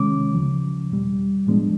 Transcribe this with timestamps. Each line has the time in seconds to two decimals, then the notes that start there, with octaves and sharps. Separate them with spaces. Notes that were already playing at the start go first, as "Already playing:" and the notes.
Already playing: C3 D#3 G#3 C#4 D6
0.34 D2 C#3 F3
0.91 E2 B2 G3
1.47 A2 F3 G#3 B3 D4